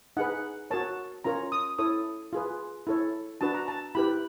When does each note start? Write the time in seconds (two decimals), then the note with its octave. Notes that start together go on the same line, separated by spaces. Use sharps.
0.17 D#4 G#4 B4 F#5
0.71 F#4 A#4 C#5 A5
1.24 C#4 F4 A#4 C#5 A#5
1.52 D#6
1.79 E4 A4 C#5 D#6
2.33 F4 G#4 B4
2.87 E4 A4 C#5
3.41 D4 F#4 B4 A5
3.54 A#5
3.68 A5
3.95 E4 G4 B4 B5